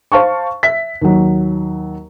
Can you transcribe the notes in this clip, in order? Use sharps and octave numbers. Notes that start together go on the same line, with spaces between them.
C5 F5 A5 C#6
E5 B6
D#2 F#3